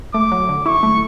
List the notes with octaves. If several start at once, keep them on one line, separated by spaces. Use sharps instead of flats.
A3 D6
F#3
D3
E4 C#6
A3